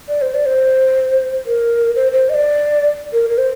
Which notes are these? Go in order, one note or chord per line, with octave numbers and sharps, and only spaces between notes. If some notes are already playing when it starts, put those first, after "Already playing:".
D5
C5
D5
C5
A#4
C5
C5
D#5
D5
A#4
A#4
C5